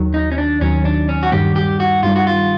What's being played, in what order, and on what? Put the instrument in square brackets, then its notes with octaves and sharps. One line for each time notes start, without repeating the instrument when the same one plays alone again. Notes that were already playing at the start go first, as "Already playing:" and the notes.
Already playing: [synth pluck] D#2 D#3 F#3
[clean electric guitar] D#4
C#4
D4
[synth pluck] D#2 D#3 F#3 [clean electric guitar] C#4
[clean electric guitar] D4
C#4
F#4
[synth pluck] G2 D#3 G3 [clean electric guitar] G4
[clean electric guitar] G4
F#4
[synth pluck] G2 D#3 G3 [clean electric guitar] F4
[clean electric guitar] F#4
F4